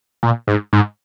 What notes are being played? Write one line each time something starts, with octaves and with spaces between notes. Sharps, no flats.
A#2
G#2
G#2